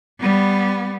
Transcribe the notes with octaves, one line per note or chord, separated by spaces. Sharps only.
G3 B3